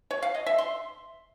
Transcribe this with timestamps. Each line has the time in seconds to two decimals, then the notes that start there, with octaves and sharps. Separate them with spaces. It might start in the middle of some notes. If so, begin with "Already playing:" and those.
0.11 C#5
0.23 F5
0.34 D#5
0.46 E5
0.58 C6